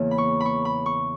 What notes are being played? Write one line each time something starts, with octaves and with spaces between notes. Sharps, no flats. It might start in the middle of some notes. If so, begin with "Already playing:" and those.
Already playing: E2 C#3 E3 A#3 C#4
B5
C#6
B5 C#6
B5
C#6